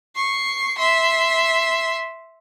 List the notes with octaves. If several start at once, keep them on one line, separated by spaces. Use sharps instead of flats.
C#6 C7
E5 C6